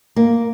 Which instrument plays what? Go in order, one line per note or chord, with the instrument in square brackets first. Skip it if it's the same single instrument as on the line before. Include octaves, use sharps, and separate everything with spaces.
[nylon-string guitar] A#3